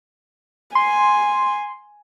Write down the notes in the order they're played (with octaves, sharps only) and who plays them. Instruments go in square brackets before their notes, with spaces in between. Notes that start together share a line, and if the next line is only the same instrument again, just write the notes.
[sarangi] G#5 [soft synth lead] C6